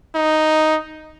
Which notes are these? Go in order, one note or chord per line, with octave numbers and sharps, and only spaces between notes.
D#4